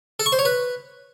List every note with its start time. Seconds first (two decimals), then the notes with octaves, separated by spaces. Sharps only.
0.20 A4
0.26 C#6
0.32 C5
0.39 C#5
0.45 B4